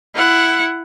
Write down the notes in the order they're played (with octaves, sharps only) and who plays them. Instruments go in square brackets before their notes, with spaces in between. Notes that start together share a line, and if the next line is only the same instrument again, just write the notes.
[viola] E4 F#5